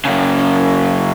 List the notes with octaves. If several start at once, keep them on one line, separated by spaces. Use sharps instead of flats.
F#2 C#3